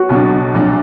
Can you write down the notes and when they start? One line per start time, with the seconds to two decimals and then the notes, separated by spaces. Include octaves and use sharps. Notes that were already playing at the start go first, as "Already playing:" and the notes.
Already playing: F#4
0.09 B1 B2 F#3 D4
0.54 A#1 A#2 F#3 D4